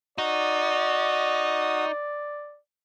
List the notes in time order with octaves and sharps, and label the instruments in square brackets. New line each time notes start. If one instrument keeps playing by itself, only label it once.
[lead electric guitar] D#4 [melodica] F#4 D#6 [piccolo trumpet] D5